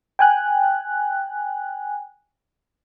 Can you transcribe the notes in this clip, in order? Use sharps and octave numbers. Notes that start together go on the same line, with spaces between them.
G5 G#5 F#6